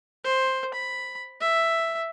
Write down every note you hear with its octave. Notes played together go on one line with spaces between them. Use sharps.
C5
B5
E5